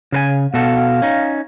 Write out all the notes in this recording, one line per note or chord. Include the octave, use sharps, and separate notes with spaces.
C#3 B4 G#5
B2 F#4 A4 F5
C#4 D#4